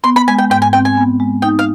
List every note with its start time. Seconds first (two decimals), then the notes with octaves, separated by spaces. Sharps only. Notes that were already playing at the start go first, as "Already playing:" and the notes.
0.04 B3 C6
0.16 B5
0.28 G#3 G#5
0.38 G5
0.50 G#2 G5
0.62 G#5
0.73 C4 G5
0.85 G#5
0.97 B3
1.20 G#3
1.42 D#4 G5
1.59 F5